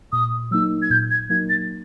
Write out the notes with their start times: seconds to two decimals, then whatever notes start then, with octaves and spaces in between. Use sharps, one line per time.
0.12 A#2 D#6
0.51 F#3 A#3 D#4 E6
0.82 G#6
0.90 A#2 G6
1.11 G#6
1.29 F#3 A#3 D#4 G#6
1.49 A6